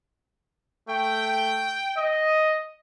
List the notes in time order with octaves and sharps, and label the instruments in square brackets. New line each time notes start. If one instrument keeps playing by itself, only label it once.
[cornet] A3 [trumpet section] G5
[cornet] D#5